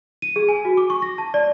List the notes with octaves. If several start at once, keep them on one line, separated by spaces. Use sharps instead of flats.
D#7
G#4
G#5
F#4
D6
C#6
A#6
A5
D5